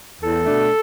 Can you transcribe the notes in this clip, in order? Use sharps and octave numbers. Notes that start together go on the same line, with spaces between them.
E2 A4
B2 A3 D4